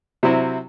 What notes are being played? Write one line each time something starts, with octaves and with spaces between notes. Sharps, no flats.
C3 F#3 C4 E4